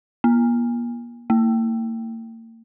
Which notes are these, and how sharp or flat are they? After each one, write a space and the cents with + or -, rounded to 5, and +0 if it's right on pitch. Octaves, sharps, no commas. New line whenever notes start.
A#3 +40
A#3 -40